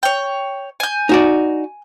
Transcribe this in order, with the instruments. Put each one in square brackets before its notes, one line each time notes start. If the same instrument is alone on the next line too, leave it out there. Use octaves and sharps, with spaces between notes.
[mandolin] C#5 G5
G#5 G6
[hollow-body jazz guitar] D#4 F#4 D5